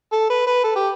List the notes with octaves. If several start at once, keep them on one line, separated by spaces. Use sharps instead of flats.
A4
B4
B4
A4
G4